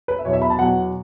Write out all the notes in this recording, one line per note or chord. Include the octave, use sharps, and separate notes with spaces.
B4
E5
E2 B2 F#3 C#5
E5
B5
A5
E2 B2 F#3 F#5